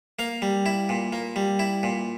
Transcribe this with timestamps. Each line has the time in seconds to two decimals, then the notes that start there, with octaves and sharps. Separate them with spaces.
0.19 A#3 F5
0.42 G3
0.66 E4
0.89 A#2
1.13 A#3
1.36 G3
1.59 E4
1.83 A#2